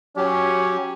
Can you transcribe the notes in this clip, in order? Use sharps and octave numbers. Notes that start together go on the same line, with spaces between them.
F#3 C#4 G4